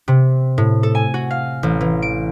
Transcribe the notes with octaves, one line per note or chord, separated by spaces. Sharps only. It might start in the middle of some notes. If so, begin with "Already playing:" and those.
C3
A2
A4
G#5
F#4
F5
A1
E3
D7